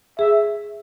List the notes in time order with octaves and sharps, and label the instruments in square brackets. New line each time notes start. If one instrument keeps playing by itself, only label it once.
[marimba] G#4 [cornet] E5